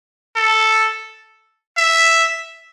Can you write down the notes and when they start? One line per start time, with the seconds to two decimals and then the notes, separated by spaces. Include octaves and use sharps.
0.36 A4
1.77 E5